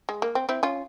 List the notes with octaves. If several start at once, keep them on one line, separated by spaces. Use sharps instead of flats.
G#3
A#3
C4
C4 E4
C#4 F4